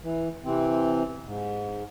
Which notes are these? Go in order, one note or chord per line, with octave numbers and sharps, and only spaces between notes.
E3
C3 E3 C4
G#2